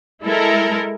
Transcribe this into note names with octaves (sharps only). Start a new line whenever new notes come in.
G#3 E4 A4 A#4